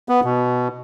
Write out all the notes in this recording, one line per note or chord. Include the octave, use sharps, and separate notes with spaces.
B3
B2